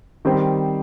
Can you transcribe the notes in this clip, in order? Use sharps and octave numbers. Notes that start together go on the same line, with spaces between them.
D#3 G3 C4 G4 C5